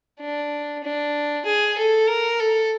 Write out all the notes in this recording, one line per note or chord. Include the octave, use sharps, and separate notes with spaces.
D4
D4
G#4
A4
A#4
A4